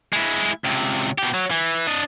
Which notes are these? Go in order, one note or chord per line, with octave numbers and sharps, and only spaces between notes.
G#3 E4
C#2 C3
B2 G4
F#3
E3
D4 D#5